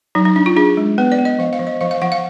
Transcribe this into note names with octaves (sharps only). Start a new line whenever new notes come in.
F#3 D#4
D#4
D4
F4
D4 G#4
G#3
B3 B4
D5
B3
D#5
F3 F5
F5
F3
D#5
F3 F5
F5
F3 F#5
F5